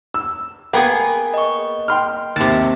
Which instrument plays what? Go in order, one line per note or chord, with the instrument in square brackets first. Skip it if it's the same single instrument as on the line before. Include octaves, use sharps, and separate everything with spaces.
[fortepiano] E6
[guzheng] A#3 B3 G#4 [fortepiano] B4 G5
[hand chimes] D#5 C#6
[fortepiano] G5 C6 F6
[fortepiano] D#2 [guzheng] C3 A5